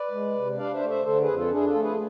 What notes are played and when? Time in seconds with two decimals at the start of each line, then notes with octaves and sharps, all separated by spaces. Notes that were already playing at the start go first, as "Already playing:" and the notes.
Already playing: B4 D5
0.11 G#3
0.35 C3
0.58 D4 D5 F5
0.73 C5 E5
0.81 A3
0.89 C5 E5
1.04 D3 A4 C5
1.21 G#4 B4
1.28 F2
1.35 F4 A4
1.51 D4 E4 G#4
1.66 F4 A4
1.74 A3
1.82 G#4 B4